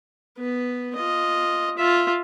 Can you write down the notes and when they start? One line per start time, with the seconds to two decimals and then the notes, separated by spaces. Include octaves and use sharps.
0.38 B3 B4
0.96 F4 D#5
1.77 F4 E5